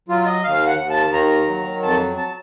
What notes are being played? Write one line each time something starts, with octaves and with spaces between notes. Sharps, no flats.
F#3 F4
D#5
D#2 F5
F#5
D#2
A5
D#3 A#5
F#3
F2 A5
A5